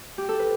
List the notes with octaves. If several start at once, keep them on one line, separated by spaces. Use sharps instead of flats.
G4
A4
B4